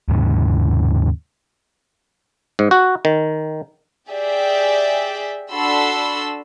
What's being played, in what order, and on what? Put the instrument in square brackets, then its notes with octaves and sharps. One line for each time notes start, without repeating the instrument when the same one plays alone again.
[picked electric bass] D#2 G#2 C#3
[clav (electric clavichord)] G#2
F#4
D#3
[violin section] G4 G#4 D5 E5 G5
D4 F#4 A4 B5 C6 E6